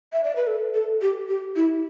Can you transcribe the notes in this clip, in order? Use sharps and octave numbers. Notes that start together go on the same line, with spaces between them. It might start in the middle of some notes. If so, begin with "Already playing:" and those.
E5
D5
B4
A4
A4
G4
G4
E4